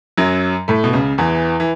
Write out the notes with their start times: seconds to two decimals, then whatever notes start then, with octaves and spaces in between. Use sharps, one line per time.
0.17 F#2 F#3
0.68 A2 A3
0.84 B2
0.93 C#2 C#3
1.18 E2 E3
1.60 E3